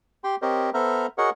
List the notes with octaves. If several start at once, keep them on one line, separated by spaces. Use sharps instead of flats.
G4 G5 C6
C4 G4 A#4 C5 C#5 D#5
B3 A4 C5 E5 A#5 F6
F#4 G#4 A#4 C#5 D#5 F#5